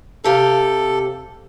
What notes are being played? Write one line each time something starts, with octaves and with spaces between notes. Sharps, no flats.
C3 G4 A4 F5